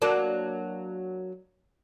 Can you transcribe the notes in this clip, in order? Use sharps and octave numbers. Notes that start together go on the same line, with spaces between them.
F#3 A#3 D4